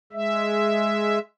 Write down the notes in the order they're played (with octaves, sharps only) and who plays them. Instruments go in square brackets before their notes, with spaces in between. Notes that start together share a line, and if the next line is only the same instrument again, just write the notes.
[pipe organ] G#3 E5